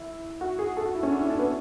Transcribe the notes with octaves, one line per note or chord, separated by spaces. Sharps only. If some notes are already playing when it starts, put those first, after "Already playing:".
Already playing: E4
F#4
G#4
A4
F#4
E4
C#4
D4
E4
D4
B3